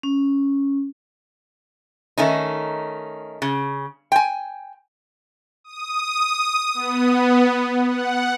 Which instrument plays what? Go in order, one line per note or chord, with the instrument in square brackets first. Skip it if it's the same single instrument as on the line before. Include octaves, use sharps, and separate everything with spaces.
[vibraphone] C#4
[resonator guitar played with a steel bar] D#3 A3 C#4 D#4
C#3
G5 G#5
[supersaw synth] D#6
B3
F#5